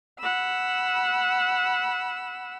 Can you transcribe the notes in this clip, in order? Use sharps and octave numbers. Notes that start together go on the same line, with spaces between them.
F#5 B5 E6